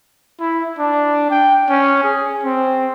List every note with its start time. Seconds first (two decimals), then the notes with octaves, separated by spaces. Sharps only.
0.40 E4
0.79 D4
1.30 G5
1.69 C#4
2.03 G#4
2.44 C4